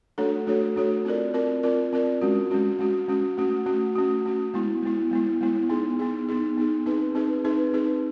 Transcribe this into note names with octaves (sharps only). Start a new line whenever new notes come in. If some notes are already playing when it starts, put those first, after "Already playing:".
A3 D4 F#4 A4 C#5
A3 D4 F#4 A4 C#5
A3 D4 F#4 A4 C#5
C4 F4 A#4 D5
C4 F4 A#4 D5
C4 F4 A#4 D5
C4 F4 A#4 D5
G#3 C#4 F#4
G#3 C#4 F#4
G#3 C#4 F#4
G#3 C#4 F#4
A3 C#4 F#4
A3 C#4 F#4
A3 C#4 F#4
A3 C#4 F#4
G#3 B3 E4
G#3 B3 E4
G#3 B3 E4
G#3 B3 E4
B3 D#4 G#4
B3 D#4 G#4
B3 D#4 G#4
B3 D#4 G#4
C4 D#4 G#4 B4
C4 D#4 G#4 B4
C4 D#4 G#4 B4
C4 D#4 G#4 B4